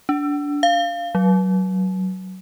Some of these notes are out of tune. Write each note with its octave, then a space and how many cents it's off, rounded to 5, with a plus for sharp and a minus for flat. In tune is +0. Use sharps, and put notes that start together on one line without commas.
D4 -20
F5 -10
F#3 +15